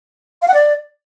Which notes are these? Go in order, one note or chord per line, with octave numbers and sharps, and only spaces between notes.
F5
F#5
D5